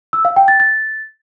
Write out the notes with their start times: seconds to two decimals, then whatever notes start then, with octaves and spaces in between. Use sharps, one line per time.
0.13 E6
0.25 F5
0.36 G5
0.48 A6
0.60 A6